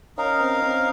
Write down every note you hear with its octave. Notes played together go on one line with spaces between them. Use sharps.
C#4 D#4 A#4 F5
C4
C4